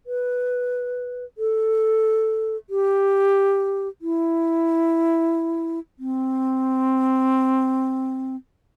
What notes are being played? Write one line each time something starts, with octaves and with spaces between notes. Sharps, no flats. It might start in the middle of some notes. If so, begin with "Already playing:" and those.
B4
A4
G4
E4
C4